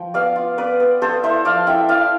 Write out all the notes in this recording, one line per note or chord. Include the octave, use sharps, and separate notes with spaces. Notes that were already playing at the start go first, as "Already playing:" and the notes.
Already playing: F3 G5
B3 D5 F5
F4
B3 B4 D5
B3
B3 A4 C5
E4 C5 E5
F3 D5 F5
E4 E5 G5
E4 D5 F5